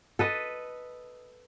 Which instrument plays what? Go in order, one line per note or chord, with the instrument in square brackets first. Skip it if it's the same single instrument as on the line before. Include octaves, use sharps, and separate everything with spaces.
[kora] A4 B4 D#5